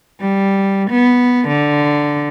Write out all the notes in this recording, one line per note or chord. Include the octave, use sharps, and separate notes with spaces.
G3
B3
D3